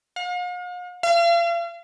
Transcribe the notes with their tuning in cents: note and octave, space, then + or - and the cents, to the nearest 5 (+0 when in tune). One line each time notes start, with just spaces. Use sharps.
F5 +45
F5 -40